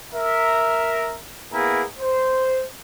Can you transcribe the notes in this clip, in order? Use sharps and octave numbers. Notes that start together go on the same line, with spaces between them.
A#4 E5
A#3 B3 E4 G#4 A#4
C5